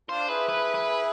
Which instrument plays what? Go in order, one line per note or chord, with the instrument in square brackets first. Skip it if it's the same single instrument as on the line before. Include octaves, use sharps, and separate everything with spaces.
[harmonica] D4 F4 [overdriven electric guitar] C5
[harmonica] E4 G#4 [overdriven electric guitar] B4
[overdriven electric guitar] B4
B4